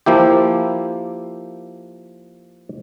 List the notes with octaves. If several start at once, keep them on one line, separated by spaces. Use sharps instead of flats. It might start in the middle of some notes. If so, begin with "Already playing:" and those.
F3 A#3 E4 G4